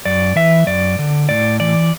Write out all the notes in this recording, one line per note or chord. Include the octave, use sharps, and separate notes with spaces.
F#2 D5
E3 E5
F#2 D5
D3
A2 D5
E3 D5